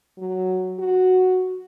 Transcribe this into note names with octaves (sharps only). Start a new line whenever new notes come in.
F#3
F#4